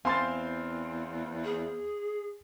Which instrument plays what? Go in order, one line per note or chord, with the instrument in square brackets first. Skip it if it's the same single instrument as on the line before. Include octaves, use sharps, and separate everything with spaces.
[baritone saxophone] E2 [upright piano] C4 C5 F5 [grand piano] G#5 C6 A6
[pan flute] G#4